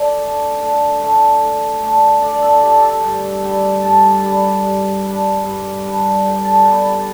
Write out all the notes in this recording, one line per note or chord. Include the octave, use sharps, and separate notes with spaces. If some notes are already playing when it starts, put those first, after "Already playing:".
Already playing: D3 D5
A3 D4
D3
A3 D4
D3
A3 D4
D3 D5
A4
A3 D4 G4
A4
G2 G5
G3 D4 G5
G2 A5
G3 D4
G2
G3 D4
G2
G3 D4
D3 G5
A5
G3 B3 G5
G5